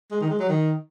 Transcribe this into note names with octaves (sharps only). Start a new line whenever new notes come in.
G#3
D#3
G#3
F#3
D#3